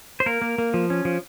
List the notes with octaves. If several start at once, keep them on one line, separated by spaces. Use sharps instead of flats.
C5
A#3 A#4
A#3
A#3
F3
C#4
F3